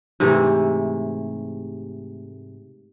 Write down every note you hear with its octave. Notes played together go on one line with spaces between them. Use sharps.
G#2 C3 E3 A3